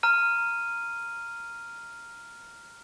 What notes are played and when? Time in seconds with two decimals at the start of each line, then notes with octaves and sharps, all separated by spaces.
0.03 A#5 F6 D#7